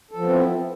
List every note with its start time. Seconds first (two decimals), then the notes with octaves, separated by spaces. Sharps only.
0.11 A4
0.16 F3
0.21 B3
0.26 C4
0.31 E4